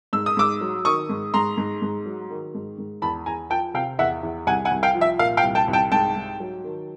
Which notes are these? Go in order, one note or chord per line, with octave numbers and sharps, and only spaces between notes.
G#2 E6
D#6
G#2 D6 E6
F#3
D#3 C#6 D#6
G#2
G#2 A#5 C6
G#2
G#2
F#3
D#3
G#2
G#2
E2 A5 B5
E2 G#5 A#5
F3 G5 A5
C3 F5 G5
E2 E5 F#5
E2
C2 F#5 G#5
F#5 G#5
C2
F5 G5
F3
E5
A#2 F5
F5 G5
C2
G5 A5
C2
G5 A5
G#2 G5 A5
G#2
F#3
D#3